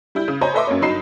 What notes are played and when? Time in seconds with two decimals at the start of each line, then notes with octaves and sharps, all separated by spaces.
0.15 G3 E4 G6
0.28 C#3
0.41 C5 C#5 D#5 G#5 A#5 B5
0.54 A4 B4 D#5 E5 C6 D6
0.67 F#2 A#3 C#5
0.82 G1 F#3 D#4 B5 C7 E7